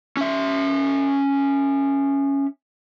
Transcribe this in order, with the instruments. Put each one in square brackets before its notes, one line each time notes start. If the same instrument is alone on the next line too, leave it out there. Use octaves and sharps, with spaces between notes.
[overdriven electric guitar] C#4 E5